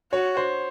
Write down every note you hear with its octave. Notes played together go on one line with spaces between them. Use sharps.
F#4 C#5
C5